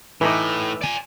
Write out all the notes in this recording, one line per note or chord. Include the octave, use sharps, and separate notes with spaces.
A2 E3 A3 D#4 B4 B5 D6
D5 G#5